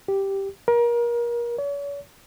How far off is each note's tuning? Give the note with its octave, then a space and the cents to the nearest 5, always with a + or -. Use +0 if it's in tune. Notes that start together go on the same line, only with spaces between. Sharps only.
G4 +0
A#4 +30
C#5 +40